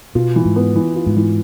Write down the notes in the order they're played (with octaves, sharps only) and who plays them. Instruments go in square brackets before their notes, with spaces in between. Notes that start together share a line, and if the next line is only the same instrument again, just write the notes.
[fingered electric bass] B2 [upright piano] F4
[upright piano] E3
[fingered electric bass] G#2
[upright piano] B3
E3
F4
[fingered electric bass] G#2
[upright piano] E3